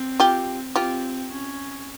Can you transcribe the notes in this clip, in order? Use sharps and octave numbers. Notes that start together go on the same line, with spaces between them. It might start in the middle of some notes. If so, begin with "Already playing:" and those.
Already playing: C4
F4 G4
C4 F4 G4
C#4